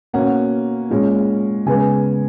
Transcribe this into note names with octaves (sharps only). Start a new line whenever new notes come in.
B2 A#3 C#4 F#5
A#2 G#3 C#4
C#3 G#3 B3 G#5